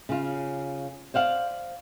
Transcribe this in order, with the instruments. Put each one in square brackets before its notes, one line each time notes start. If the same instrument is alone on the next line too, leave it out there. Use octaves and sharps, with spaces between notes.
[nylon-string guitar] C#3 F4
C5 D5 F5 F#5